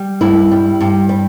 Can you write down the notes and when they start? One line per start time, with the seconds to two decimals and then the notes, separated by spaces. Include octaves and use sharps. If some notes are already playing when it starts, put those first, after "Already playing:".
Already playing: G3
0.21 G2 E4
0.51 G3
0.81 G2
1.09 G3